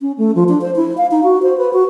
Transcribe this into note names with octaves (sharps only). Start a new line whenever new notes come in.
C#4
A3
F3
D4
C5
E4
F5
D#4
F#4
C5
B4
F#4